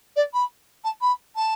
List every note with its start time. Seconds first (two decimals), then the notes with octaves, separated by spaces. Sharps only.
0.16 D5
0.33 B5
0.84 A5
1.01 B5
1.36 A5